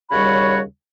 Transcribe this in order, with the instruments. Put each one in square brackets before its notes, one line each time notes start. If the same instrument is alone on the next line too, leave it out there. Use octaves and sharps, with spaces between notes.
[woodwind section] D#2 C#3 G3 F#4 C#5 B5